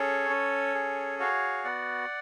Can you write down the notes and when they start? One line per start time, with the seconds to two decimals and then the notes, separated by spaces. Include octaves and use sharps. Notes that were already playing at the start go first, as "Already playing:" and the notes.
Already playing: C#4 G#4 A4 C#5
0.30 C#4
0.75 G#4
1.19 F#4 C#5 F5
1.64 B3 D5 F#5